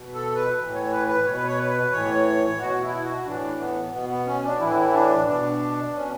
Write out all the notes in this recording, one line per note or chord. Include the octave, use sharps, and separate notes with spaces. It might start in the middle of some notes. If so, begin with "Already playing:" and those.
Already playing: B2
A4
B4
A2 E3
C#5
B4
B4
B2 C#5
B4
C#5
B4
A2 E3 C#5
B2 F#4
E4
F#4
A2 E3 D4
B3
B2 B3
B3
C#4
D4
A2 E3 E4
D4
B2 D4
B2 C#4